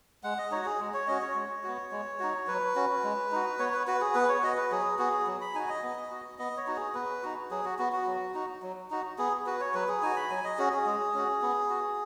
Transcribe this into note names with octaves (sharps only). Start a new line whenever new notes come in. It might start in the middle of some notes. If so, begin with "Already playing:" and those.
G#3 F#5
D#5
D#4 F#4 C#5
G#4
G#3
C#5
C#4 F#4 D#5
C#5
G#3
B3 F#4
G#3
D#4 F#4
F#3 B4
C#4 F#4
G#3
D#4 F#4
B3 C#5
B4
F#4 B4
G#4
B3 B4
C#5
F#4 D#5
B4
F#3 G#4
B3 F#4 G#4
F#3
B5
D#4 F#4 G#5
D#5
B3
F#4
B3 D#5
C#5
D#4 F#4
G#4
B3 B4
D#4 F#4
F#3 G#4
F#4
B3 F#4
F#4
F#3
D#4 F#4
F#3
D#4 F#4
B3 G#4
F#4 B4
C#5
F#3 B4
G#4
D#4 F#4 G#5
B5
F#3 G#5
D#5
C#4 F#4 G#4
G#4
G#3
C#4 F#4
B3
F#4